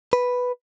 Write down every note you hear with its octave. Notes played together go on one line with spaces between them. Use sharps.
B4